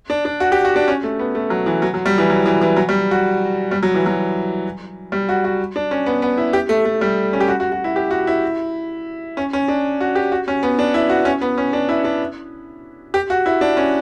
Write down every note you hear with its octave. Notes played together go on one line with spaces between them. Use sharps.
D4
D4
F#4
G4
F#4
D4
C#4
A3
B3
A3
F#3
E3
F#3
F#3
G3
E3
F#3
E3
E3
F#3
G3
F#4
G3
F#3
E3
F#3
G3
F#4
F#4
D4
C#4
B3
B3
E4
G4
A3
A3
G3
C#4
G4
F#4
F#4
F#4
E4
G4
F#4
E4
C#4
C#4
D4
F#4
G4
F#4
C#4
B3
D4
E4
F#4
C#4
B3
C#4
D4
E4
D4
G4
F#4
E4
D4
C#4